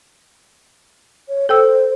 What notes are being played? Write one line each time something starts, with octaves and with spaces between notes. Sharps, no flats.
C#5
A4 C5 G5 E6